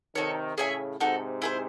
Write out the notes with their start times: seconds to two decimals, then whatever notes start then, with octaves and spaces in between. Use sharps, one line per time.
0.15 C3 D#3 D#4 A4 C#5
0.57 A2 C#3 G#4 C#5 E5 G#5
0.99 G#2 C3 D#4 F#4 A4
1.42 E4 G#4 C5